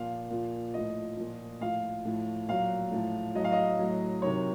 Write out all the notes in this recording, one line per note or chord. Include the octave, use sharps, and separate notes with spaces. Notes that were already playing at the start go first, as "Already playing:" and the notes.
Already playing: A#2 F3 F5
A#2 F3
A2 F3 D#5
A#2 F3
A2 F3 F5
A2 F3
A#2 F#3 F5
A2 F3
A2 F#3 D#5
F5
D#5
A2 F#3
C3 D#3 F#3 C#5